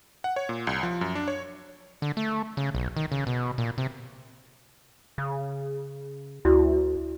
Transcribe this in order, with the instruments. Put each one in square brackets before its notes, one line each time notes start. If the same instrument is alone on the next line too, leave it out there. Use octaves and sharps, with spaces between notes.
[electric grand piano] F#5
C#5
A#2
C2
F3
F#2
D4
C#5
[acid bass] D3
A3
C#3
B1
D#3
C#3
B2
A#2
C3
C#3
[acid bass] D2 [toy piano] E4 F#4 D5